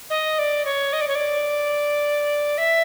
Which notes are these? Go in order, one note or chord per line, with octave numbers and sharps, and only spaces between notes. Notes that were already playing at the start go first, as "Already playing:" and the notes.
D#5
D5
C#5
D#5
D5
C#5
D5
E5